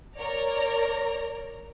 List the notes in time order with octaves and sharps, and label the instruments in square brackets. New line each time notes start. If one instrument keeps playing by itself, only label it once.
[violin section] A#4 C#5 D5 A#5